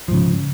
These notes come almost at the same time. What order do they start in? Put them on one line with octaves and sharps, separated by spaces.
F3 G#2 C#3